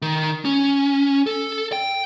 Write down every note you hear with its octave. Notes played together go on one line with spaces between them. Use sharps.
D#3
C#4
A4
G5